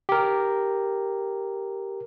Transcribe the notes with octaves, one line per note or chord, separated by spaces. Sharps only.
G4 A#4